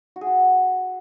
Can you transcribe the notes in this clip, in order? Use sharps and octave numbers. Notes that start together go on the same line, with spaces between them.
F#4
G#4
F#4